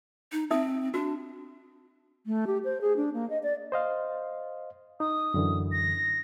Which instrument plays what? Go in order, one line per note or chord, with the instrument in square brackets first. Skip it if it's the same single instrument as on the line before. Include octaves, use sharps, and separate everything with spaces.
[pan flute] D#4
[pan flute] C4 [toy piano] D#4 E5 D#6
[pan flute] D4 [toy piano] F#4
[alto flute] A3
G4
C5
G#4
D4
A#3
D#5
D5
[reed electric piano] C5 D#5 F5
[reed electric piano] D#4 [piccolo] D#6
[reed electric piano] F#2 D3 E3
[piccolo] A#6